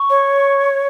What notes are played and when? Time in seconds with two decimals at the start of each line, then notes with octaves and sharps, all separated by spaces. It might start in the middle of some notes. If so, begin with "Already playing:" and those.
Already playing: C#6
0.10 C#5